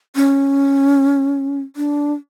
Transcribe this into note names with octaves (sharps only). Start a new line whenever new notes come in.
C#4
D4